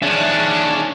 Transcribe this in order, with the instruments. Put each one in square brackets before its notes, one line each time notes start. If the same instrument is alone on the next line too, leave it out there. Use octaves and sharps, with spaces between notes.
[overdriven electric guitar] D#2 C#4 [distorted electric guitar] D4 [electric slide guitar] G#4 E5